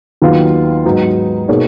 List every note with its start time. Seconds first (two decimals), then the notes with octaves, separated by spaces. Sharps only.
0.22 D#2 D#3 F#3 B3 F4
0.85 G#2 F#3 B3 D#4
1.48 B2 A#3 D#4 G#4 C#5